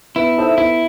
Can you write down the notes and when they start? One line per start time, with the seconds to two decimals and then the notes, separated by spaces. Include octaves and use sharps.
0.16 B3 E4
0.37 D#4 A4 C5 E5
0.58 B3 E4